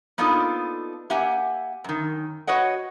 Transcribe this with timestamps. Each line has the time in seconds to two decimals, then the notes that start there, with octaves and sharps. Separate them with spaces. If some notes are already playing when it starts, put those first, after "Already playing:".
0.18 A#3 B3 D4 D#4 F4 A4
1.10 A#3 G4 E5 F#5 G#5
1.84 F#2 D#3
2.47 F#4 B4 C#5 D#5 F#5